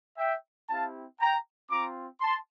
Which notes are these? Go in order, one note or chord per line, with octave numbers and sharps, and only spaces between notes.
E5 G5
C4 E4 G4 F5 A5
G5 A#5
C4 F4 A#5 D6
A5 C6